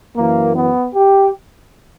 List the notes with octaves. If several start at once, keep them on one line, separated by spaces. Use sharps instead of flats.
F#2 E3 A#3
B3
G4